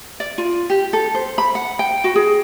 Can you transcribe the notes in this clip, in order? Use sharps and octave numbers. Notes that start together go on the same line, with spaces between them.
D5
F4
G4
A4
C5
B5
F#5
G5
F#4
G#4